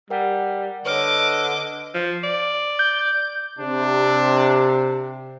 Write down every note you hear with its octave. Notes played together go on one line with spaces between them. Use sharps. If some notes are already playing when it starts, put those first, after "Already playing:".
G3 A#4 F#5
D3 B4 C#5 D#5 D6 F6
F3
D5
G6
C3 D4